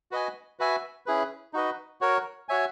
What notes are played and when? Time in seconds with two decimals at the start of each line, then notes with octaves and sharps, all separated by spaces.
0.11 F#4 B4 D#5 G#5
0.59 F#4 B4 E5 G#5
1.06 C#4 E4 G#4 B4
1.53 D#4 F#4 B4 D#5
2.01 F#4 A#4 C#5
2.49 F#4 C#5 E5 G#5